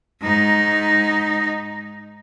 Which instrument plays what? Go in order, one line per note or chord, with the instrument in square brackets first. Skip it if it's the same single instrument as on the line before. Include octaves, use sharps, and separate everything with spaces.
[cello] G#2 D#4